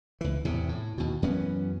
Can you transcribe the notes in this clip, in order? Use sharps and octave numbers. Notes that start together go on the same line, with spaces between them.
C#2 E3
E2 A2 C3
A2
D#2 B2
F#2 E3 B3 C#4